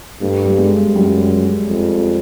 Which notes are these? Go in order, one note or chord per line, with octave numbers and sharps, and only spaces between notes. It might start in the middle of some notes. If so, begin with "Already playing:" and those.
G2 A3
G3
G#3
F#2 G3
F2